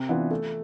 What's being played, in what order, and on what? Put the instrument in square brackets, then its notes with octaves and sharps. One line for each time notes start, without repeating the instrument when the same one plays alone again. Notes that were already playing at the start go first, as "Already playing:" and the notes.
Already playing: [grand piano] C3
E3 B3 D4 F4
A3